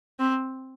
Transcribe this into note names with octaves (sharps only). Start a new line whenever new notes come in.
C4